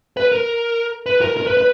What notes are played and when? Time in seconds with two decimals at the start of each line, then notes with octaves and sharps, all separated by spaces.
0.17 B4
0.32 A#4
1.06 B4
1.22 A#4
1.37 A#4
1.47 B4
1.57 B4